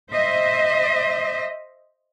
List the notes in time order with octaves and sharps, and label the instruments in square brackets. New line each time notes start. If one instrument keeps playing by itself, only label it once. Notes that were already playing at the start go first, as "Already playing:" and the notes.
[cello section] C5 D#5 E5